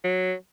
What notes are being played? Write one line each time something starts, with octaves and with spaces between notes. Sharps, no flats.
F#3